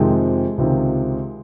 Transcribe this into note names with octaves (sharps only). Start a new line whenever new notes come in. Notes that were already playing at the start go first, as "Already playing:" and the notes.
Already playing: F2 C3 D#3 G#3
C#2 C3 D#3